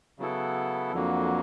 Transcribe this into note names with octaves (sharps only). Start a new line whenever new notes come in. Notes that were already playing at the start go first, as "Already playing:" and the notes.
C#3 F#3 B3 E4 A4
F2 D3 F#3 A#3